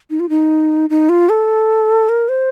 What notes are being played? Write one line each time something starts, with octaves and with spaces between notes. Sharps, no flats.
D#4
F4
D#4
D#4
F4
A4
A#4
C5